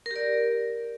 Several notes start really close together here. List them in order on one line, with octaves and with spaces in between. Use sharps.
A#4 G4 D5